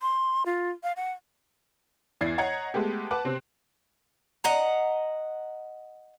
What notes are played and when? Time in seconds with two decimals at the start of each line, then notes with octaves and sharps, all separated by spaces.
0.02 C6
0.46 F4
0.83 F5
0.96 F#5
2.21 E2 E4 D5 G#6 A6 C7
2.38 C#5 D#5 F#5 A#5 G#6 C#7
2.74 G#3 A3 B3 G4
3.11 B4 F#5 A5 D6 F#6
3.25 C3 C4
4.44 D#5 F#5 A#5